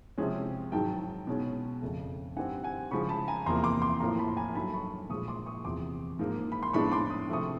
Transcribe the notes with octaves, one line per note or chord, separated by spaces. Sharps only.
C3 F3 G#3 C#4
G#2 D#3 F#3 G5 A5
B2 G#3 C#4
F2 C#3 F3 A3
G2 D#3 G3 C4 F#5 G#5
F#5 G#5
C#3 F3 G#3 B5 C#6
A5 B5
G#5 A#5
E2 C3 F3 A#3 A#5 C6
C6 D6
C6 D6
A2 F3 A#3 A#5 C6
A5 B5
G#5 A#5
G2 D#3 F#3 A3 D4 A5 B5
B5 C#6
A#2 F3 G#3 C#6 D#6
C6 D6
C#6 D#6
E2 C3 F3 C6 D6
G#2 F3 A#3
B5
C6
A2 F3 G#3 B3 D4 B5 C#6
C6 D6
D#6
C3 F3 A3 C#6 D#6